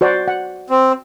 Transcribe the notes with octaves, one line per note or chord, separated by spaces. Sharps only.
F#4 C5 D5
F#5
C4